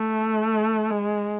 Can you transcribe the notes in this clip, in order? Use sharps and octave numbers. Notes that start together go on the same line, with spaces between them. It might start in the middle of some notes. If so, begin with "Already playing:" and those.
Already playing: A3
G#3